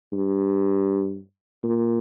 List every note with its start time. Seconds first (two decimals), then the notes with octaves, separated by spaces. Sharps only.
0.12 G2
1.63 A#2